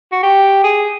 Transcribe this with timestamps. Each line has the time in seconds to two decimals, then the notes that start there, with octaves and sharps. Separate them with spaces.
0.12 F#4
0.23 G4
0.64 G#4